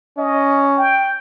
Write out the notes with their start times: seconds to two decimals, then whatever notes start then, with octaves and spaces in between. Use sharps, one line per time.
0.18 C#4 D#5
0.77 G5